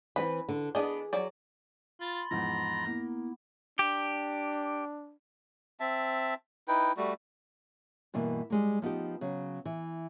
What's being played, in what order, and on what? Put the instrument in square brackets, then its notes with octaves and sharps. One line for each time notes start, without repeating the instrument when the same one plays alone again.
[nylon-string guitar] E3 C4 B4 [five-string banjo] B5
[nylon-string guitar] D3
[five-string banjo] B3 D4 D#5 [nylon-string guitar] G#4
[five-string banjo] F#3 D5
[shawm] F4 [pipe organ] B5 C6 A6
[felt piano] E2 G#2 F3 [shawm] A#5
[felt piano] A#3 [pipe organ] B3 E4
[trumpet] D4 [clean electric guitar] G4
[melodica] C4 E5 A5
D#4 E4 B4 G5
G3 A3 F#4
[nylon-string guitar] G2 B2 E3 A#3
G3 G#3 A#3
F3 B3 D#4 G4
C#3 F#3
E3